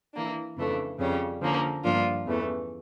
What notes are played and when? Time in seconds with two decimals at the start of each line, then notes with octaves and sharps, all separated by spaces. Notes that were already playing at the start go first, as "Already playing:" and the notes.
0.14 E3 A#3 D4
0.56 F2 C#3 E3 A3 D4
0.98 F2 C#3 G3 C#4
1.41 D3 F3 A#3 C#4
1.83 G2 F3 A#3 D4 F4
2.26 E2 C#3 E3 A3